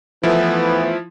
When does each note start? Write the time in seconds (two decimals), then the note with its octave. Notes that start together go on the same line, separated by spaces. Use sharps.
0.23 E3 F3 A3 B3 E4